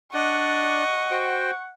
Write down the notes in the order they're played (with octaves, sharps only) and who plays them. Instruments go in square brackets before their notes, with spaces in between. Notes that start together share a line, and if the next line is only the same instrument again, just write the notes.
[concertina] D4 D5 [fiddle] D#5 [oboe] F#5 [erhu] C#6
[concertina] F#4 C5 G5